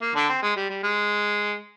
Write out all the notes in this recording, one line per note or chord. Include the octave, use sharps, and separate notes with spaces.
A#3
D3 D4
C4
G#3
G3
G3
G#3